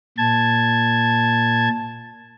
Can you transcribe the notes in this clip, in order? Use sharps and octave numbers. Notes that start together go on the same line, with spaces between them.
A#2 A5 G#6